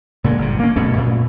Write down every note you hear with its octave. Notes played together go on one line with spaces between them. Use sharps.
A#2 D3 F#3 G#3
G1 C3
A#3 C#4
F#2 B2 A3 C#4
A#2